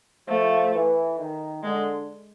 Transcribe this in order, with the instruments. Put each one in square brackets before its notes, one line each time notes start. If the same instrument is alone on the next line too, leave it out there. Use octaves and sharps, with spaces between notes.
[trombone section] F3 [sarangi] A3
[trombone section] E3
D#3
[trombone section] D3 [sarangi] G#3